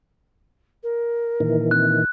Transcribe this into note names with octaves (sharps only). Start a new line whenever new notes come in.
A#4
A#2 D#3 E3
C4 F#6